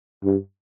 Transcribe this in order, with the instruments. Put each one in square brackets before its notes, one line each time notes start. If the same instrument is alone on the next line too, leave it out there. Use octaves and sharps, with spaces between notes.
[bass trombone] G2